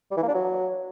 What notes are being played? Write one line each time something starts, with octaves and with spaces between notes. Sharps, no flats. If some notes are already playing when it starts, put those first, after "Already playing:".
G3
E3
A#3
D4
F#3